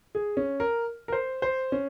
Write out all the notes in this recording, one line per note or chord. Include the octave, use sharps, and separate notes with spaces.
G#4
C#4
A#4
A#4
C5
C5
C#4